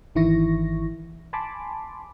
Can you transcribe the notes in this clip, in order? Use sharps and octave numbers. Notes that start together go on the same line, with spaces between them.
G#1 D#3 E3 E4 C#6 A#6
G#5 A5 B5 C6 D6